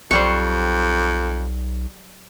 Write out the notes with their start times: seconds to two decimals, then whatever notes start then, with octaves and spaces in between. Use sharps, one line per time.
0.11 B1 F2 F#3 G3 C5 C#6